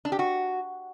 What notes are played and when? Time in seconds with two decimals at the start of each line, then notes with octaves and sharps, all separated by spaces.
0.05 D4
0.12 G4
0.19 F#4